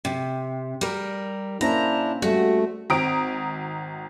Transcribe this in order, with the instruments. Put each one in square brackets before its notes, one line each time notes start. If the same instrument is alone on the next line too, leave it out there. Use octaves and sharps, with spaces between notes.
[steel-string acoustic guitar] C3
G3 A#4
[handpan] A#3 C#4 C5 [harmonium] D4 E4 [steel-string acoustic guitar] A#5
[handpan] G3 [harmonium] A3 [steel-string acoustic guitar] F#4
[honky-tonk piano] G#1 C4 A#5 D#6 D7